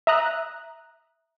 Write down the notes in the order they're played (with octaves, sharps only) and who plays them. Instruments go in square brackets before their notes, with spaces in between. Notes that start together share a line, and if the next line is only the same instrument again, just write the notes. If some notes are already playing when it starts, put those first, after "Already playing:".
[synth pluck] E5 A#5 D#6 F#6